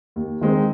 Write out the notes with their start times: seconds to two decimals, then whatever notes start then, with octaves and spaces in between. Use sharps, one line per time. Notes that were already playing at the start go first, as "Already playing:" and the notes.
0.16 D#2
0.41 D#3 G#3 C4